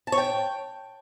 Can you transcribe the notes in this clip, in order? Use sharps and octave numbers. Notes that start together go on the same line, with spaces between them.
A5
C#5
G5